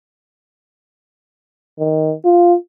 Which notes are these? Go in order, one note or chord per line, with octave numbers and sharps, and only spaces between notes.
D#3
F4